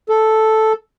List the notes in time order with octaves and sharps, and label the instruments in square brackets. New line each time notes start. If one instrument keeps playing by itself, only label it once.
[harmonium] A4